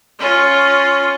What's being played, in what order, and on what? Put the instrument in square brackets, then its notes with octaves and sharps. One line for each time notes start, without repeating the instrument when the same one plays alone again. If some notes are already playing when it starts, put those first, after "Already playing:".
[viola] C#4 F4